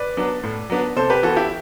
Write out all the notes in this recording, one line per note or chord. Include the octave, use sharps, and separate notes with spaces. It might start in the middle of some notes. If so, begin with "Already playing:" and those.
Already playing: B4 D5
F#3 B3 D4
A2
F#3 B3 D4
C3 A4 C5
G4 B4
E3 B3 F#4 A4
E4 G4